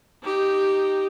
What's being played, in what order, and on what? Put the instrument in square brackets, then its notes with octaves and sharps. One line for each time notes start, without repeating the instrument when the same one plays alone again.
[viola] D#4 G4